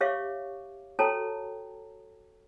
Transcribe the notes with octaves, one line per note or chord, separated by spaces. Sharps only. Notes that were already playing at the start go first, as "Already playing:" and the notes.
G4 C#5 E5 F5 C#6 D6
F#4 A4 C#5 G5 A5 A#5